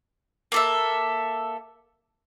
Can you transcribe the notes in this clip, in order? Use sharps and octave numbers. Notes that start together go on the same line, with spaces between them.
A#3 A4 E5